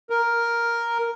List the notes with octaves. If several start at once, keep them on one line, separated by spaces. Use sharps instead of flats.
A#4